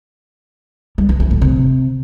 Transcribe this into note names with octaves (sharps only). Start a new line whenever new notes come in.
G3
E3
E3
A2
C3